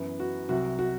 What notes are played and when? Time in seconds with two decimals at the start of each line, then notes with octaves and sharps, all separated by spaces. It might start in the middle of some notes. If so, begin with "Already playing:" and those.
Already playing: F#2 E3 B3 E4
0.20 F#4
0.49 C2 C3 F#3 F#4
0.79 F#4